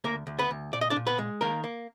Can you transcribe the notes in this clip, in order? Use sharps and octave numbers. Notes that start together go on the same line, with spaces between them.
D2 A#3 A#4
D2
B3 B4
D2
A#2 D5
D#5
D4 D5
A#2
B3 B4
G#3
D#3 A#3 A#4
A#3